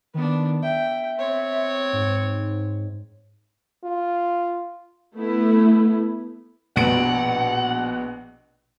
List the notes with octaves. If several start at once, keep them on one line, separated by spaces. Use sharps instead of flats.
D#3 B3 D4
E5 G5
C4 C#5
G#2
F4
A3 B3 E4
A#1 B2 F#5 D7